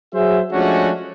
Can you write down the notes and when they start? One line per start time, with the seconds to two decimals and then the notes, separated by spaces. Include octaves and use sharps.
0.14 F#3 G#4 C5 E5
0.53 F3 G#3 A3 C#4 D4 F#4